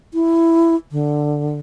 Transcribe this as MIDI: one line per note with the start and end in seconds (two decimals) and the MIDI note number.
0.14 0.76 64
0.92 1.59 50